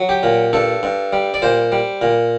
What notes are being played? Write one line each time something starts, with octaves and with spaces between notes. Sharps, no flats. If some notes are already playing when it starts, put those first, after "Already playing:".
Already playing: F#3
G4
A#2
G2 A4
G2
G3
D5
A#2 C5
G3
A#2